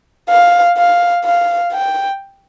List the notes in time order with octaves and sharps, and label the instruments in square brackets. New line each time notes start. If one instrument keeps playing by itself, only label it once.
[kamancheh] F5
F5
F5
G5